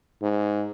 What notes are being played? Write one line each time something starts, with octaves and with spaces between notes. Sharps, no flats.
G#2